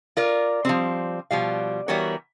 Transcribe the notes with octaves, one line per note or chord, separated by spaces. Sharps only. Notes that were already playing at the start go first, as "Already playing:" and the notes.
F4 A#4 D5
F3 G3 C4
B2 F3 G3 F5
E3 G3 B3 F#4 A#4 C#5